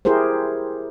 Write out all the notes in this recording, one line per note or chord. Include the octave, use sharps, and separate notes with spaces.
E4 G4 G#4 A#4 C5